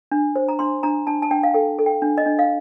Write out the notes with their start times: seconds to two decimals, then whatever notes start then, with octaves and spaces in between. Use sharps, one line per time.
0.12 D4
0.36 C5
0.48 A#5
0.59 D4 C6
0.83 D4 A#5
1.07 D4 A5
1.22 A5
1.31 D4 G5
1.43 F5
1.54 A4 G5
1.79 A4
1.86 G5
2.02 D4
2.18 D#5
2.26 D4
2.39 F5